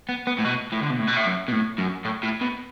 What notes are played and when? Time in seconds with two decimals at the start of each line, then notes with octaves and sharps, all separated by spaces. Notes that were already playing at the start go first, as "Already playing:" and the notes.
0.09 B3
0.27 B3
0.39 A2
0.45 B2
0.72 A2
0.82 D3
0.90 B2
0.99 A2
1.07 B2
1.16 A2
1.25 F#2
1.48 B2
1.52 A2
1.78 F#2
2.05 A2
2.23 A2
2.42 B2